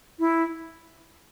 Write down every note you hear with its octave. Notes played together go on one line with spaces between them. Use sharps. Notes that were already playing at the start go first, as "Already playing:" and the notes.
E4